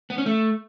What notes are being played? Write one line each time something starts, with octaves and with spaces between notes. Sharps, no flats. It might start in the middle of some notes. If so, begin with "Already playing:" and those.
B3
C#4
A3